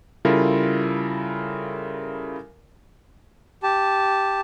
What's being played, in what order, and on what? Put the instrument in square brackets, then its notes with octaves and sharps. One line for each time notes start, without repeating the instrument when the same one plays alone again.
[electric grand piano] C#3 G3 E4 F4 A4 A#4
[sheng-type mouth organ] G4 A5